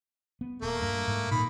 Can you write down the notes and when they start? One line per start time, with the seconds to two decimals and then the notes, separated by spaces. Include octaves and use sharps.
0.41 B3
0.62 D#1 A3 A#3
0.81 G2
1.07 G#2
1.31 A#2 D#3 B5